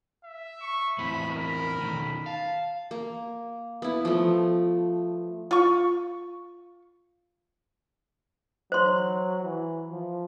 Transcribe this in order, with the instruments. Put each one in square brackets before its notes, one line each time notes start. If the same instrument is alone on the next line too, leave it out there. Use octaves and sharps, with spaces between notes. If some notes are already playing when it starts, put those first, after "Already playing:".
[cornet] E5
[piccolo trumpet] C#6
[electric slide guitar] E2 A2 C4 [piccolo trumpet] B5
[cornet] A#4 [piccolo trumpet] B5
[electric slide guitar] B2 D#3
[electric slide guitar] F5 [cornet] A5
[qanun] A#3
B3 E4
F3 A3
[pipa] F4 C#6
[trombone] F#3 [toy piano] C5 C6
[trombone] E3
F3